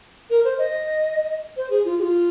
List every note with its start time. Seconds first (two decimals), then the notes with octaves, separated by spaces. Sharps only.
0.30 A#4
0.44 C5
0.58 D#5
1.57 C5
1.70 G#4
1.85 F4
1.99 G#4
2.02 F4